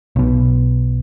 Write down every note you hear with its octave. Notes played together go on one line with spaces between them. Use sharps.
B1 B2